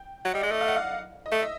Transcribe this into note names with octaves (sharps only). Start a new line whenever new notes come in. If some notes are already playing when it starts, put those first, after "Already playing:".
Already playing: G5
F#3 F#5
G3 D#5
G#3 D5
A3 D#5
F5
F#5
F5
D#5
A3 E5
D#5